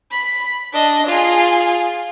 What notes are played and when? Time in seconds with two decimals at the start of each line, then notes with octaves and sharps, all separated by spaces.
0.11 B5
0.73 D4 D#5
1.06 F4 G#4